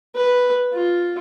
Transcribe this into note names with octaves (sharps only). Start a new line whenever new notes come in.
B4
F4